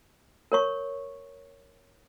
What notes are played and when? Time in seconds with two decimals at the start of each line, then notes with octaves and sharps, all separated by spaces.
0.52 A#4 C#5 C#6